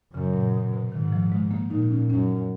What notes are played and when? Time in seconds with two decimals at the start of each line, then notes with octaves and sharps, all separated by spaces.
0.13 F#2 C#3
0.33 A#2
0.53 B2
0.73 B2
0.92 G#2 D#3
1.12 F3
1.32 G#3
1.51 A#3
1.70 A#2 D#4
1.90 C#4
2.10 F#2 C#4